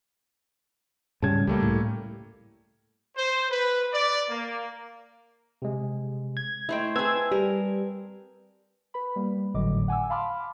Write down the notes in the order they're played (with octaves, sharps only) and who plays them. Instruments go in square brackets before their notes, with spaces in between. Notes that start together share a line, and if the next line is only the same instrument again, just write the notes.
[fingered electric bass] G#2 C#3 G3 [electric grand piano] A5 G#6
[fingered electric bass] C#2 [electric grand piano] G3 A3 A#3
[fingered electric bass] A2
[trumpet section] C5
B4
D5
A#3
[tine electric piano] C3 G#3
[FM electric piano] G#6
[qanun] A3 C5 G5 [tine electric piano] E4 D#5
[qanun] C4 G#4 [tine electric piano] B4 A5 [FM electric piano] E6 G#6
[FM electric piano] G3 [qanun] A#4
[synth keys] B4 B5
G3 A#3
G#1 A2 D3 F#3 D#5 D6
F#5 G#5 D6 E6
F5 A5 B5 C6 D6 F6